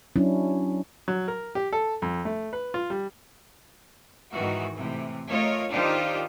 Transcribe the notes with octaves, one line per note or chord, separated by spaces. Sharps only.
F#3 C#4 D4 E4
F#3
A#4
G4
A4
F2
A3
B4
F4
G3
G#2 D#3 E3 F#4
A2 C3 E3
A3 F4 A#4 C#5 D#5
D#3 D4 D#4 F4 G4 C5